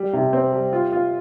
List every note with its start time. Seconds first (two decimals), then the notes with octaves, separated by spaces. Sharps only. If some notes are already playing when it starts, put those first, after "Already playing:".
Already playing: G3
0.13 C3
0.33 C4
0.52 G3
0.73 F4
0.92 F4